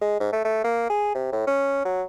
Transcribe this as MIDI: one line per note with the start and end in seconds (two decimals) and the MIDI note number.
0.01 0.18 56
0.20 0.31 44
0.32 0.41 57
0.44 0.63 57
0.64 0.85 58
0.90 1.13 68
1.15 1.29 48
1.32 1.44 45
1.47 1.82 61
1.85 2.03 54